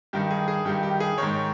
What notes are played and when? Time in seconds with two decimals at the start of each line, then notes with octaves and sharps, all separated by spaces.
0.13 G2 D#3 G4
0.31 G#4
0.48 G#4
0.65 G2 D#3 G4
0.83 G4
1.00 G#4
1.18 G#2 D#3 C#5